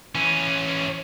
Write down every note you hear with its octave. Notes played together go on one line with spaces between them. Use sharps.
E3 C#4